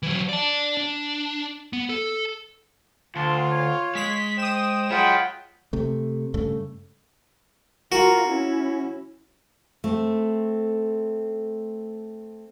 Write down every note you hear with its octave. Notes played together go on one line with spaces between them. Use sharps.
E3 F#3
D5 A5
D4
B3
A4
D2 F4 A5 C6
C#5
G#3 B6
C5 G5 D#6 E7
G#3 F4 C#5 F#5 G5 B5
C3 A3
G2 C#3 A3
F4 F#4 A#4
C#4 E4
A3 C4